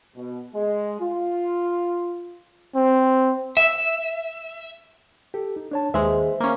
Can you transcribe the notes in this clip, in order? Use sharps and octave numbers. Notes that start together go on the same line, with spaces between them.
B2
G#3
F4
C4
E5
G4 A4
D#4
D4 C#5 A5
D#2 G#3 B4 C5 E5
A#3 C#4